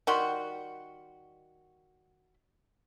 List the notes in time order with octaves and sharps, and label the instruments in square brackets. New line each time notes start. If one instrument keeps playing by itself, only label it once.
[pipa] D#3 G3 F#4 C6